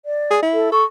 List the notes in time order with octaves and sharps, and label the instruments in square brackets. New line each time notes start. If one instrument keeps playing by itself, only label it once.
[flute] D5
[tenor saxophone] G#4
E4
[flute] A4
[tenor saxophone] A4 [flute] C#6